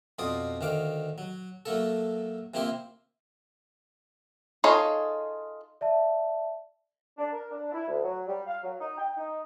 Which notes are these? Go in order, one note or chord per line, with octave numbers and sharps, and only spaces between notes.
F2 B2 F4 D5 D#6
D2 D#3 F5 D6
F#3
F#3 A3 A#3 A4
C3 F3 A#3 E4 G4 C6
D#4 F4 G#4 A4 C#5
D5 E5 A5
D4
A#4
D4
E4
D2
F#3
G3
F5
F#3
D#4
G5
D#4